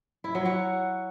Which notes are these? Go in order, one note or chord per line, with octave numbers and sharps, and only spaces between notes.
E4
F#3
F#4